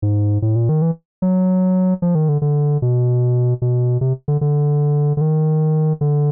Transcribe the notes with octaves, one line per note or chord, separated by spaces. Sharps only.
G#2
A2
A#2
D#3
E3
F#3
F3
D#3
D3
D3
B2
B2
C3
D3
D3
D3
D#3
D3